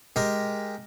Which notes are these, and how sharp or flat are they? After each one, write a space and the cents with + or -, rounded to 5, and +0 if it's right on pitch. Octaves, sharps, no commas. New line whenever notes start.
G#3 +0 G4 +0 A#4 +0